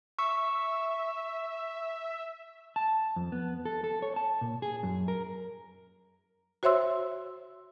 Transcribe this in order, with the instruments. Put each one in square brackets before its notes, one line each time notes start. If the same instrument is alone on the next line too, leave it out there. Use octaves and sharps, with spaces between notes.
[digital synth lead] E5 [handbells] C#6
[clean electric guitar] A5
F2
B3
A4
A4
C#5
A5
A#2
G#4
F#2
A#4
[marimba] F#4 C5 C#5 E5 C6 E6